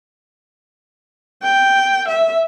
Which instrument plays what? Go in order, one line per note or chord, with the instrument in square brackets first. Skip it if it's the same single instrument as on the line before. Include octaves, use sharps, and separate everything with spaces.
[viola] G5
E5